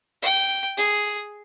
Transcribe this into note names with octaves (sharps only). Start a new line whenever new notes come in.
G5
G#4